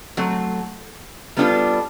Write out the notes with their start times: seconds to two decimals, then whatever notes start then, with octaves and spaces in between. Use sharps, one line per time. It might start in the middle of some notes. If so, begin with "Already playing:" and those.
0.17 F#3 A3 C4
1.37 G3 B3 D4 F4 A4